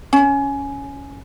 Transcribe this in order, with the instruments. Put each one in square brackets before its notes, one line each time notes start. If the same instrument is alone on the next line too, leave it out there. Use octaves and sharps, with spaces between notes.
[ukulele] C#4